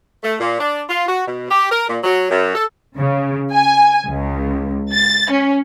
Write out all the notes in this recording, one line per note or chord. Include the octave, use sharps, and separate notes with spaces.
A3
A#2
D4
F4
F#4
B2
G4
A#4
A#2
F#3
F#2
A4
C#3
G#5
C#2
A6
C#4